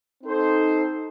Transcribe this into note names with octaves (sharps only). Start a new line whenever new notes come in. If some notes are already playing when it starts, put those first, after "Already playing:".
C4 D#4 A4 C5